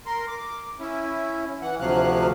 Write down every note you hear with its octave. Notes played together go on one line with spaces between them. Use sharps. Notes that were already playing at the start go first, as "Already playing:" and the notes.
A#4 C6
D6
C#4 E4
E3 F#5
D2 C3 F3 F#3 F5 F#6